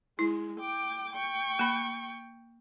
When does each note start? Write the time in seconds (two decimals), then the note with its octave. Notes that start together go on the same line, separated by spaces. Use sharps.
0.19 G#3 E4
0.60 G5 D6
1.13 G5 C#6
1.59 A#3 B5